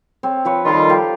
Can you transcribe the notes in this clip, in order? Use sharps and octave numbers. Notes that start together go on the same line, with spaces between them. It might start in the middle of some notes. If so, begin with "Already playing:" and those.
C4 C#5
F3 B4 C#5
D#3 G3 F4 A4 B4
G4 A#4 F5